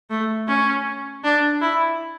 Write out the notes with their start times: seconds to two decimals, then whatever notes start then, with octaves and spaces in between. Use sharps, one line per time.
0.10 A3
0.48 C#4
1.24 D4
1.61 E4